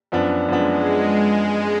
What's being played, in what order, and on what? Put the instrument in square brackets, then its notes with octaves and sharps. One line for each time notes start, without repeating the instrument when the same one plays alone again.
[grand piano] F#2 F3 B3 D4
[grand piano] F#2 F3 B3 D4 [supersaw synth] G#3